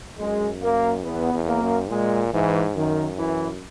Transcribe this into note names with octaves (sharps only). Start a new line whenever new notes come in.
F#2 G#3
A#3
E2 B3
E2
A#3
F#2
A#2 G#3
G#2 E3
F#2 D#3
E3